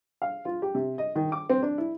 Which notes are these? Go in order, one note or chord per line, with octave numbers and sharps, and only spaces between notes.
F5
F4
G4
C3
D#5
D#3
D6
C4
D4
E4